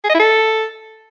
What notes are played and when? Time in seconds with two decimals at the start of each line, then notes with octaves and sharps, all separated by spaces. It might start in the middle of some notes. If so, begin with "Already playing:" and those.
0.04 G#4
0.09 D#5
0.14 E4
0.20 A4